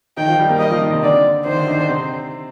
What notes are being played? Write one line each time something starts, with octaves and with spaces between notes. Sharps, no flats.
D#3 D#4 G5
F3 F4
G3 G4
A#3 A#4
G3 G4 D#5
F3 F4
D#3 D#4
C3 C4
D3 D4 D5
D#3 D#4 C5
D3 D4
D#3 D#4
D3 D4
C3 C4